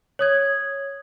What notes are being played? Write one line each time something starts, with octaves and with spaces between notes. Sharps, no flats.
C#5 D#6 G#6